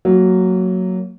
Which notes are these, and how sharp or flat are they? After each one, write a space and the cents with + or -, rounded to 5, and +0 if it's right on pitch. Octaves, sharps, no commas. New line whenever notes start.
F#3 +0 A#3 -15